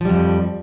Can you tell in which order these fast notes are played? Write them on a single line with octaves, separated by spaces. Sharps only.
F3 G3 F2